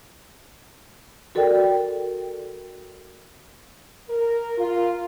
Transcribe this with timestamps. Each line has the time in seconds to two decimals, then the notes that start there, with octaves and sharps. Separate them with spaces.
1.35 F#4 A4 A#4 D5 G5
4.10 A#4
4.58 F4